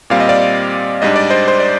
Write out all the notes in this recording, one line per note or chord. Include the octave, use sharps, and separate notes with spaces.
A#2 G3 C4 F5
D#5
D5 F5
G#2 G3 D4 D#5
D5
C5 D#5
C5
D5